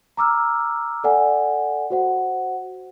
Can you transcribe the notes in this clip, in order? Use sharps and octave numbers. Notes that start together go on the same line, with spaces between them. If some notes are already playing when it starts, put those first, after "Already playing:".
A#5 D6 E6 F6
A4 D5 F#5 G#5
F#4 C5 F#5